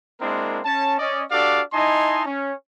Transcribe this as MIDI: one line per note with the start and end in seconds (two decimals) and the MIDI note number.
0.21 0.60 56
0.21 0.60 58
0.21 0.60 60
0.21 0.60 62
0.21 0.60 64
0.21 0.60 70
0.65 0.97 61
0.65 0.97 81
0.99 1.22 61
0.99 1.22 74
0.99 1.22 75
1.30 1.61 62
1.30 1.61 66
1.30 1.61 67
1.30 1.61 69
1.30 1.61 74
1.30 1.61 77
1.72 2.25 63
1.72 2.25 64
1.72 2.25 75
1.72 2.25 80
1.72 2.25 81
1.72 2.25 84
2.26 2.53 61